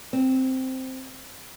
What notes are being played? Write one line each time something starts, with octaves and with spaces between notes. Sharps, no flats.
C4